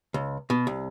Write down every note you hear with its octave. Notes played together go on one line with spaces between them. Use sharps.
C#2
B2
C2